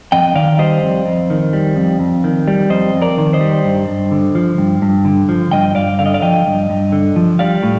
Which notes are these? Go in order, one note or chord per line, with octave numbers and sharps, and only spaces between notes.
F2 D#5 G5
D#3 D5 F5
G3 C5 D#5
F2
F2
D#3
G3
F2
F2
D#3
G3
F2 C5 D#5
F2
A#4 D5
D#3
C5 D#5
G3
G2
G2
D3
F3
G2
G2
D3
F3
G2 D#5 G5
G2 D5 F5
D3 F5
D#5
D5 F5
F3 D#5 G5
G2
G2
D3
F3
G3 D5 F5
A2